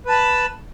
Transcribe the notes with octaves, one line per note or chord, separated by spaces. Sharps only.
B4 A5 B5